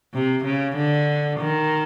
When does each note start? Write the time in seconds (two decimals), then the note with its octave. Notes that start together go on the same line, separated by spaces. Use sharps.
0.14 C3
0.45 C#3
0.76 D3
1.40 D#3